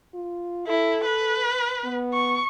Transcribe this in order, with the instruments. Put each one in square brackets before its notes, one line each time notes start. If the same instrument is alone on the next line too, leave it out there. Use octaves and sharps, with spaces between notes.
[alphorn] F4
[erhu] E4 [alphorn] A4
[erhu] B4
[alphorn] B3
[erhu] C#6